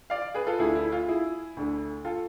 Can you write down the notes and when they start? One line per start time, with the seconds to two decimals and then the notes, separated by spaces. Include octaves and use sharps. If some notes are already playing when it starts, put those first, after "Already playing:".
0.10 D5 F5
0.34 G#4 B4
0.47 F4 A4
0.59 D2 D3 A3 E4 G#4
0.75 E4
0.92 F4
1.08 E4 G#4
1.57 D2 D3 A3
2.05 F4 A4